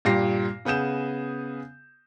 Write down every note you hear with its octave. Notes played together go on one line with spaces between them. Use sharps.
G2 A#2 G4 A#6 C7
C#3 B3 G#4 G6 E7